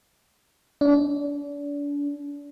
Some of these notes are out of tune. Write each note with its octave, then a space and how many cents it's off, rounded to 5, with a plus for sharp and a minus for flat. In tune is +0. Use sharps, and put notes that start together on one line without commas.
D4 -35